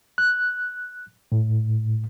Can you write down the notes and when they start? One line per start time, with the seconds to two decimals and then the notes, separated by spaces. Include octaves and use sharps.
0.18 F#6
1.32 A2